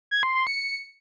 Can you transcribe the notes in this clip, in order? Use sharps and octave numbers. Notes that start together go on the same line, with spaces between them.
G#6
C6
C6
C#7